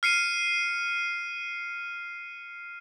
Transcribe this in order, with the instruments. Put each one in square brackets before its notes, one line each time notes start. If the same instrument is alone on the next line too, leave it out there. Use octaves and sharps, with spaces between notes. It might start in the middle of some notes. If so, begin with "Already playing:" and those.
[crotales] F6 C7 C#7 D#7